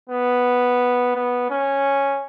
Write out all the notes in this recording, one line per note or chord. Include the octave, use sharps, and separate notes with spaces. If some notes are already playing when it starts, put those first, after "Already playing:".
B3
B3
C#4